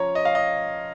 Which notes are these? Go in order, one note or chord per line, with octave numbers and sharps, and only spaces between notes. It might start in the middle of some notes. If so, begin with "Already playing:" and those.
Already playing: F3 C#4 F4 C#5 A#5
D#5
F5
D#5